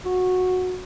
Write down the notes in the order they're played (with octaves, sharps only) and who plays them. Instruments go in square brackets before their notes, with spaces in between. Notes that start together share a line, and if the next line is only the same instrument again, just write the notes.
[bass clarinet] F#4